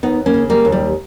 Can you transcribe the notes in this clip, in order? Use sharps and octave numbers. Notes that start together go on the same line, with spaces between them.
D#2 B3 D#4
A#3 C#4
C#3
G3 A#3
D#2
G3